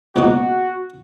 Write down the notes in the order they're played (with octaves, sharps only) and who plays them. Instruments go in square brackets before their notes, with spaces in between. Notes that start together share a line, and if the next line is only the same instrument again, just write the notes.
[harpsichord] C#2 B2 A#3 D#4 [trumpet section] F#4